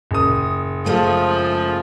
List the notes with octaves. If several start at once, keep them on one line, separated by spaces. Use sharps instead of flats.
F#1 D#6
F3 G#3 A3